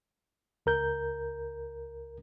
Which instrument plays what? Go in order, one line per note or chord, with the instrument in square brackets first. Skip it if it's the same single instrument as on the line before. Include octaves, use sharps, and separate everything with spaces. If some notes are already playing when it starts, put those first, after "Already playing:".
[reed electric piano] C#2 A#4 G6